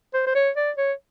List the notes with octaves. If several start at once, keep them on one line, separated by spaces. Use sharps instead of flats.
C5
C5
C#5
D5
C#5